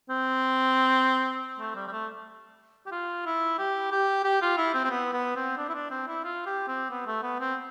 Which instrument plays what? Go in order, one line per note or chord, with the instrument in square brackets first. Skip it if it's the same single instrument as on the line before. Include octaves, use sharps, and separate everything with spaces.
[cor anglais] C4
A3
G3
G3
A3
G4
F4
E4
G4
G4
G4
F4
E4
C4
C4
B3
B3
C4
D4
E4
D4
C4
E4
F4
G4
C4
B3
A3
B3
C4